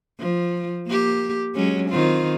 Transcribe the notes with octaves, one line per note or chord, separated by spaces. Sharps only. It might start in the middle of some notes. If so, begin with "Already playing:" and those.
F3
A#3 G4
F#3 G#3 C#4
D#3 C4 F4